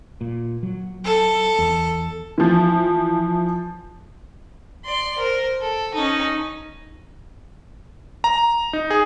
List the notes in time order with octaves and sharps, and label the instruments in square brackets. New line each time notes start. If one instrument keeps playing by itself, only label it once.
[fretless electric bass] A#2
F#3
[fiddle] A4
[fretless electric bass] E2
[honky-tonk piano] E3 F3
[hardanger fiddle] D5 C6
A#4 C5
A4
C#4 D#4
[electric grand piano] A#5
D#4
G#4